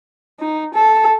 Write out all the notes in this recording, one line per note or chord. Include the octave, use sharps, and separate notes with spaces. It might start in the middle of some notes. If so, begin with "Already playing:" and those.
D#4
A4